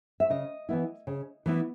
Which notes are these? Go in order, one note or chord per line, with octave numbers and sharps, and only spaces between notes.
E5
C#3 D#5
E3 B3 E4
C#3
E3 B3 E4